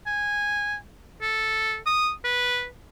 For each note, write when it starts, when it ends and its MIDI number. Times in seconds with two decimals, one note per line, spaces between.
0.07 0.76 80
1.22 1.77 69
1.86 2.12 87
2.25 2.67 71